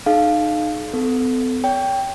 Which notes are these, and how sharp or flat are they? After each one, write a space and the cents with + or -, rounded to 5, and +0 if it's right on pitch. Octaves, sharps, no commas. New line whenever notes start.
D#4 -25 G#4 +45 F5 +0
B3 +45 A4 +0
C#5 +30 G5 +0